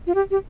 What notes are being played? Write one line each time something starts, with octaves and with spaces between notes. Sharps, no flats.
F4
G4
G4